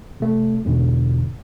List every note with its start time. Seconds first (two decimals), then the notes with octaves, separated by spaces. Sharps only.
0.20 C3 A3
0.65 E2 G#2 B2 D3